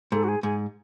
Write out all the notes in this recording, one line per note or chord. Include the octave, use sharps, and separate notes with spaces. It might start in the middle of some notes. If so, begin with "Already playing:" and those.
G#2 A4
F#4
G#4
G#2 G#4